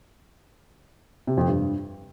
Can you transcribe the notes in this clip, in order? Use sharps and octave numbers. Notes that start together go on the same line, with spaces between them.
C3
F2
G2